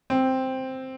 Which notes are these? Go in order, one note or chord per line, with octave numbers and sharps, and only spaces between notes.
C4